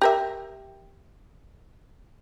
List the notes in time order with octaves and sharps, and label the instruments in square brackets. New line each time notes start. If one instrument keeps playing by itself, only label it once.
[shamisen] G4 A#4 E5